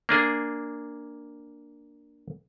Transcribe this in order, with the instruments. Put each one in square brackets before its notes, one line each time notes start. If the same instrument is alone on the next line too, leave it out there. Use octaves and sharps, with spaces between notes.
[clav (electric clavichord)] A#3 D4 G#4